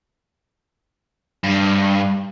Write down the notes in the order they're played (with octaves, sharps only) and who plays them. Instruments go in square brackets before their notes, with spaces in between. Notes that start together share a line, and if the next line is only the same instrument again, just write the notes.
[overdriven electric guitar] G2